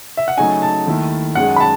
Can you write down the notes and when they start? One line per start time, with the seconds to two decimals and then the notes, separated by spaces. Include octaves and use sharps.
0.17 E5
0.28 F#5
0.37 C#3 F#3 A3 D#4 F#4 G#5
0.62 A5
0.87 D#2 D#3 A3 E4
1.35 F#2 D#3 G#3 F#5
1.56 B5
1.60 A5